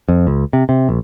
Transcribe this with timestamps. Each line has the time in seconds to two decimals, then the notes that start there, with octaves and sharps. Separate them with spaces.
0.08 F2
0.27 C#2
0.53 C3
0.69 C3
0.89 A#1